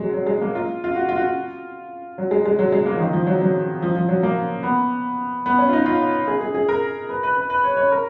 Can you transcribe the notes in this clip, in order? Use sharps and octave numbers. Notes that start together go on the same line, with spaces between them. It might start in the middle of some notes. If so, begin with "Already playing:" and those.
Already playing: F#3 G#3
F#3
G#3
A#3
F4
F4
F#4
F4
F#4
F4
F#3
G#3
G#3
F#3
G#3
A#3
F3
D#3
F3
F#3
F#3
F3
F3
F#3
A#3
B3
B3
C#4
F4
D#4
F4
G#4
G#4
G#4
A#4
B4
B4
B4
B4
C#5
C#5
A#4